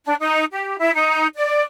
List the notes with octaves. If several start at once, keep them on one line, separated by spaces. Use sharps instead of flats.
D4
D#4
G4
E4
D#4
D5